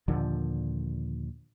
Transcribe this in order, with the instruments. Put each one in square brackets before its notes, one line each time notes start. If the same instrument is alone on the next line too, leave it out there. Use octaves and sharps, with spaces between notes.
[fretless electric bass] D#2 A#2 D3 F3